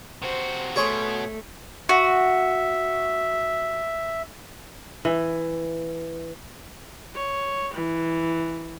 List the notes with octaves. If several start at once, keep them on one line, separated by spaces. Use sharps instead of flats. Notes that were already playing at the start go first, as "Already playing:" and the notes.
C3 F#4 C5
B2 A3 G#4 C#5 C6
F#4 E5
E3
C#5
E3